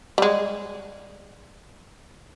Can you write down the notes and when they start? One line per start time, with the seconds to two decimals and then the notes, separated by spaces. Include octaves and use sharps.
0.18 G3 G#3